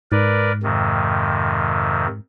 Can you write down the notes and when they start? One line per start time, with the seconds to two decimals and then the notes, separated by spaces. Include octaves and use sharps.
0.12 G#2 A#4 B4 D5
0.63 F2 C3 D#3